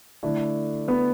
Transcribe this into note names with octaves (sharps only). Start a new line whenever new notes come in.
D3 A3 D4 E4 D5
B3 B4